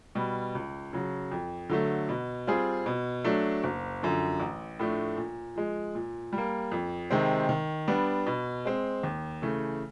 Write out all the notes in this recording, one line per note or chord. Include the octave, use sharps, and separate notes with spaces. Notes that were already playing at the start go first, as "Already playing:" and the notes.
B2 G3
C#2
C#3 F#3
F2
D3 F#3 A3
B2
G3 C4 F4 G#4
B2
F#3 A3 D4
F#1
F#2 D3 F3
A1
A2 F3 A3 D4
A#2
F3 G#3
A#2
G3
A#3
F2
C3 D#3 G#3 C4
D#3
G3 B3 D4
B2
G#3 C4
D#2
C#3 E3 A3